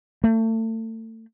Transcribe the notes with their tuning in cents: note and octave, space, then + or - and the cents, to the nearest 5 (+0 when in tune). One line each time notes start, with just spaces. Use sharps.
A3 +30